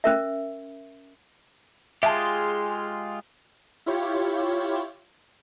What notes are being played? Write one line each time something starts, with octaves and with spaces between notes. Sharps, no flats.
C#4 A#4 E5
G#3 F4 G4 G#4 E5 A5
E4 F4 G4 C#5